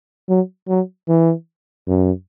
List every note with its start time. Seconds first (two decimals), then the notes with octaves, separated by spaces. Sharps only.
0.29 F#3
0.68 F#3
1.08 E3
1.88 F#2